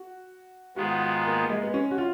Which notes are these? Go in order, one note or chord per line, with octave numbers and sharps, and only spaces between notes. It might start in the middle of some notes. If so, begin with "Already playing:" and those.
Already playing: F#4
G#2 D#3 G#3 B3 F4 F#4
A#3
G#3
B3
C#4
F#4
F4